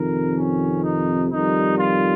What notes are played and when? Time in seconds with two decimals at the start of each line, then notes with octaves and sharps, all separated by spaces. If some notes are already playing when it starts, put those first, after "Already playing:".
Already playing: F2 C3 D#3 A#4
0.36 C#4
0.84 D#4
1.31 F2 D#3 G3 D#4
1.79 F4